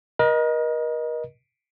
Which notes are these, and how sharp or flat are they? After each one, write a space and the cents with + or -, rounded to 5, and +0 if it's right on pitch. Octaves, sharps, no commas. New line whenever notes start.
A#4 +40 D#5 +0